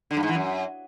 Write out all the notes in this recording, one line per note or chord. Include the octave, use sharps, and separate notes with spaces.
D3
G2
G#2
E3
F#2